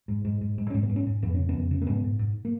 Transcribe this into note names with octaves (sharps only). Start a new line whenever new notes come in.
G#2
G#2
G#2
G#2
G#2 C#4
B3
G#2
C#4
G#2
F2 B3
C#3 C#4
B3
F2
C#3
A#3
G#2 B3
G#2
G#2
A#3